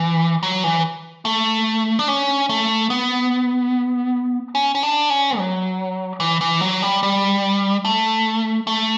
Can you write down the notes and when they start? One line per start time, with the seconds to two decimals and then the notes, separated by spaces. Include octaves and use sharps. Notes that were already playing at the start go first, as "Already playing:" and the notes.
Already playing: E3
0.43 F#3
0.64 E3
1.25 A3
1.99 D4
2.08 C#4
2.49 A3
2.90 B3
4.55 C#4
4.75 C#4
4.83 D4
5.10 C#4
5.38 F#3
6.20 E3
6.41 E3
6.61 F#3
6.82 G3
7.03 G3
7.85 A3
8.67 A3